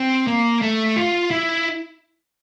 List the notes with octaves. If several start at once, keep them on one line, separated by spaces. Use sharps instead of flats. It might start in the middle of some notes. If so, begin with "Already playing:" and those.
Already playing: C4
A#3
A3
F4
E4